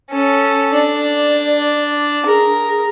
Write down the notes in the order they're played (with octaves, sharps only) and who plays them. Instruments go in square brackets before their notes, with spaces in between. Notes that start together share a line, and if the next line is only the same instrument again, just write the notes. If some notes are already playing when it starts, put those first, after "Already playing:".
[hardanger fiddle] C#4 A4
[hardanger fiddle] D4 [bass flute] D5
[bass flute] G#4 [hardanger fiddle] A#4